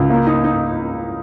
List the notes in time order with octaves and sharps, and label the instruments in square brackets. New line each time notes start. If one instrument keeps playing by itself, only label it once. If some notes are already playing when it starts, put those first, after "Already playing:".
Already playing: [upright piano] C#2
A#3
D#4
D#4